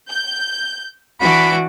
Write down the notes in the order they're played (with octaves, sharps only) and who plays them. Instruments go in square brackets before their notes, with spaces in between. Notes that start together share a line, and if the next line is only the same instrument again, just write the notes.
[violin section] G6
[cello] E3 F#4 [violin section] D4 D6 D7 [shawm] B5